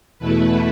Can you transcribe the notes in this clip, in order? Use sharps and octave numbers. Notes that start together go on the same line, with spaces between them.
E2 B2 A3 E4 B4